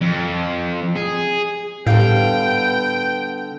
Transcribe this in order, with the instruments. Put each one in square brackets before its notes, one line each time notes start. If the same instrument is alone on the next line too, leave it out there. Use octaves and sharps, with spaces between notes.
[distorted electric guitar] F2
G#4
[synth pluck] A2 G6 [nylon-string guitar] D3 G3 F5 [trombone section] B3 [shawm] G5